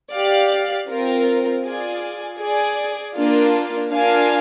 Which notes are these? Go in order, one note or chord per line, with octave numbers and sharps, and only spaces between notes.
G4 D5 F5
C4 F4 A#4
F4 G#4 D5 G#5
G#4 D5 G#5
A#3 D4 F4
D4 F4 A#4 F5 G#5